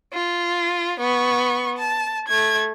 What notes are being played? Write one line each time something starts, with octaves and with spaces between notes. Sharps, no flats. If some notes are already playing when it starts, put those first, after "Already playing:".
F4
B3 C#6
A5
A3 G#6